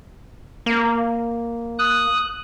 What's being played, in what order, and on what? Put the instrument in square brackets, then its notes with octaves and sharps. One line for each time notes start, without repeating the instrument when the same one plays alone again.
[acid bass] A#3
[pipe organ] D#6 F#6